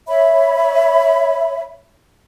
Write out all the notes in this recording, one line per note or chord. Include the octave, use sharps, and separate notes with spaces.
C#5 E5 B5